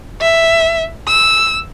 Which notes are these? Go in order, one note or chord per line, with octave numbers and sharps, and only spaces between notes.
E5
E6